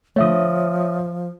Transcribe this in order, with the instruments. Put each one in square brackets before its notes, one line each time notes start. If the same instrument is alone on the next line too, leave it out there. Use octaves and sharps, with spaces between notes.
[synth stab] D3 A3 [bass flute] F3 [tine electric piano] C#5 E5 D#6